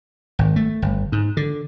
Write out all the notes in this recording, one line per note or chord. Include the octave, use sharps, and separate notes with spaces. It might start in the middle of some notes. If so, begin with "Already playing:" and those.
G#1
A3
G1
G#2
D3